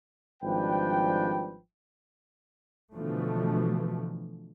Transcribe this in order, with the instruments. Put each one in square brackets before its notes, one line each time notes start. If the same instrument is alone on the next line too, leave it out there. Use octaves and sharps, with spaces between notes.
[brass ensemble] G#1 F3 G3 D4 B4 G5
[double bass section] B2 D3 E3 F3 A3